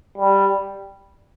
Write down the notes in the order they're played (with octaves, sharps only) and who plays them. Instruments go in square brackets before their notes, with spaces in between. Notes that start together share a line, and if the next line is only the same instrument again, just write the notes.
[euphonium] G3